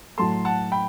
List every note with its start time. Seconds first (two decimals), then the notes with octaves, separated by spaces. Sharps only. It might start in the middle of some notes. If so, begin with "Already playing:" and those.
0.18 A2 F#3 A3 A5 C6
0.45 F#5 A5
0.72 G5 B5